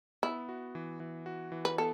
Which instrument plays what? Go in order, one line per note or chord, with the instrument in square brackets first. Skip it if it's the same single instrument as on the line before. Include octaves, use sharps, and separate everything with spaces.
[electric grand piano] B3 [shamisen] E4
[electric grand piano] F#4
E3
E3
F#4
E3
[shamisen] B4
[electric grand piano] B3 [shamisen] A4